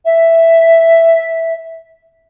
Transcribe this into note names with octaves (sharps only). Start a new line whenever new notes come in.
E5